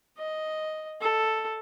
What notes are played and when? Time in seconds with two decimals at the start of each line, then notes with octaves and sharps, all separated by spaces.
0.18 D#5
1.01 A4